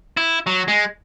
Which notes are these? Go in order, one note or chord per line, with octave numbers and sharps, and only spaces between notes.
E4
F#3
G#3